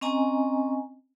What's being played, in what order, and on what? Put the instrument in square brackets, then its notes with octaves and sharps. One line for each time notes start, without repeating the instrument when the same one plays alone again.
[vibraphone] C4 C#4 D#5 G#5 A#5